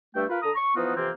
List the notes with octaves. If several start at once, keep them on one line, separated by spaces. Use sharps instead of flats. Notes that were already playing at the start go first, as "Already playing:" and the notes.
G2 A3 G5
F4 A#4 B4
D3 A4 A#5 D#6
C#6
E3 F3 B3 D#4 F4 F#4
F2 C3 E3 A#3 C4